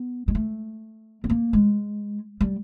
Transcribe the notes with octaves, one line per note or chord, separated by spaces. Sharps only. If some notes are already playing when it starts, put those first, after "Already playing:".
Already playing: B3
G#3
A3
B3
A#3
G#3
G3